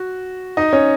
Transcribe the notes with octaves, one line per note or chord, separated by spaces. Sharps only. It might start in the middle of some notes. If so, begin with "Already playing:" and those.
Already playing: F#4
D#4 D#5
C#4 C#5